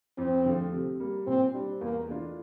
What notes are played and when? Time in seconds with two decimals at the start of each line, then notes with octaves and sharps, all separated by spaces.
0.18 F2 C4
0.46 D3 F3 A3
0.72 C3
1.00 G3 A#3
1.27 A#2 C4
1.54 G3 D4
1.81 E2 A#3
2.08 E3 A3 D4 F4